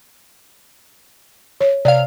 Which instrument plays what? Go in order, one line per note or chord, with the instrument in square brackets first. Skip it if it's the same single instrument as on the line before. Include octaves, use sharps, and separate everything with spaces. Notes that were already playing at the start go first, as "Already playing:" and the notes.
[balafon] C#5
[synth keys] C3 F5 [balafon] D5